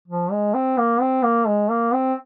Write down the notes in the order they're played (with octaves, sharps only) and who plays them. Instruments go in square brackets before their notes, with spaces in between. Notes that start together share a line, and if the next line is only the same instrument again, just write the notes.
[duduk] F3
G#3
C4
A#3
C4
A#3
G#3
A#3
C4